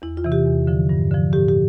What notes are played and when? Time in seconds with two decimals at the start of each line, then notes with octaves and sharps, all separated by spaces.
0.02 E2 E4
0.17 F4
0.24 C3 E3
0.32 G4
0.46 E2
0.67 D3 F3
0.89 G2
1.11 D3 F3
1.33 A2 G4
1.48 G4